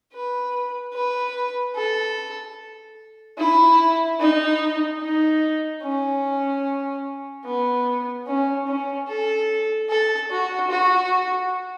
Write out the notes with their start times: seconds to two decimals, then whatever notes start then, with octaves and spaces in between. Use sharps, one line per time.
0.13 B4
0.93 B4
1.75 A4
3.38 E4
4.20 D#4
5.00 D#4
5.82 C#4
7.44 B3
8.27 C#4
8.67 C#4
9.08 A4
9.89 A4
10.30 F#4
10.70 F#4